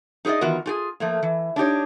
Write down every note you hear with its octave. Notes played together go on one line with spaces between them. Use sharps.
D#4 G#4 A#4 D5 D#5
D#3 E3 B3 F4 F#4 A#4
F4 G4 G#4
F3 A3 A#3
E3
D4 D#4 G4 C#5